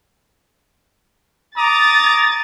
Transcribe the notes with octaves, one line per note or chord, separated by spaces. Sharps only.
A#5 D6 D#6 A6